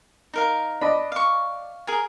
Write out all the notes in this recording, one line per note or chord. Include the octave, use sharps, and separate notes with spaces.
D#4 A#4 F5
D4 D#5 B5
F5 C#6
G#4 A#4 G#5